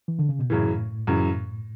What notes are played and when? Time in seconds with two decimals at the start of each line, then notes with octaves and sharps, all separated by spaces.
0.08 E3
0.19 D3
0.29 C#3
0.39 B2
0.50 F#2 A2 C#3 E3
1.07 F#2 C#3 E3